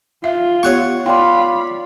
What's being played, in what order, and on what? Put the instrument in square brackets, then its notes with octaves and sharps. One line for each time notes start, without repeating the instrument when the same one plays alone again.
[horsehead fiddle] F4 [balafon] E5 F5
[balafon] B3 G4 [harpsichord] C#5 F#5 C#6
[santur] F4 D5 C6 [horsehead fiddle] F5 B5 [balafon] G5